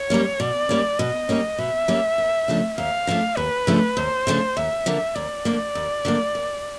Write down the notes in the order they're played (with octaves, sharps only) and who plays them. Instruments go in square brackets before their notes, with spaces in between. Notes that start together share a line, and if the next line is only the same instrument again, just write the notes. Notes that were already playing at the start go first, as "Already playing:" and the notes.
Already playing: [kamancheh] C#5
[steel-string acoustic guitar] G3 A#3 C#4
[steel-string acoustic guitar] B2 [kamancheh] D5
[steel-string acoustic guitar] G3 A#3 C#4
[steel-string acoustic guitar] B2 [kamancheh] D#5
[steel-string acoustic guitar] G3 A#3 C#4
[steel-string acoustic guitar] B2 [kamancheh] E5
[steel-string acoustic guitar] G3 A#3 C#4
D#2
C#3 F3 A3 D4
[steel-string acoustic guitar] D#2 [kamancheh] F5
[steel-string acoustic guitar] C#3 F3 A3 D4
[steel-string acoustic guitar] D#2 [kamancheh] B4
[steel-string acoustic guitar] C#3 F3 A3 D4
[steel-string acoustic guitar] D#2 [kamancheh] C5
[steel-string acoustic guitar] C#3 F3 A3 D4
[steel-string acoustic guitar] D#2 [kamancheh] E5
[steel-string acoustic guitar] D3 F3 A#3
[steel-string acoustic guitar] D#2 [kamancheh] D5
[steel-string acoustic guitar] D3 F3 A#3
D#2
D3 F3 A#3
D#2